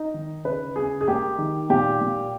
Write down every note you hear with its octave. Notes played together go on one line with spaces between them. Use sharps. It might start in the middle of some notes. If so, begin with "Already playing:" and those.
Already playing: D#4
D#3
C#3 B4
C#3 G#4
G#4
A#3 G4
D#3
A#2 G4
A#2